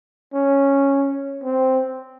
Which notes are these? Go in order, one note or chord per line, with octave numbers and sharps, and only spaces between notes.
C#4
C4